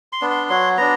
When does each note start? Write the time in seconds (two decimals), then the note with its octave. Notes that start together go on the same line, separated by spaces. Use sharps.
0.13 C6
0.22 B3 D4
0.31 C6
0.50 F#3 C6
0.77 B3 D4 A#5